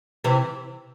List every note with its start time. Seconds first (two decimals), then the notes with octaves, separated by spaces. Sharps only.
0.24 C3 E3